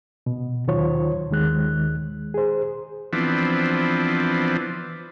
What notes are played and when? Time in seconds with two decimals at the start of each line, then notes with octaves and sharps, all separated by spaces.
0.26 B2
0.67 D#2 D#3 F#3 F4 C5 C#5
1.30 D#2 D#3 G#3 F#6
2.34 G#4 C5
3.13 E3 F3 B3 C4 D4